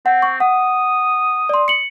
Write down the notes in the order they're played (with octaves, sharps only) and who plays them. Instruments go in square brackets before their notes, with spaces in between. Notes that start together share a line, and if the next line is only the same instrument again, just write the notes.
[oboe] C4 [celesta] F#5
[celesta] C#6
[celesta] F#5 [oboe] D#6
[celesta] D5 C6
C#7 F#7